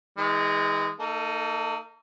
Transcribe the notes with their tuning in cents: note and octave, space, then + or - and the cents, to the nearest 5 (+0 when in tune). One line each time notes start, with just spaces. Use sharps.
E3 -45 G#3 -15 B4 +0
A#3 -40 D#4 +0 A4 +0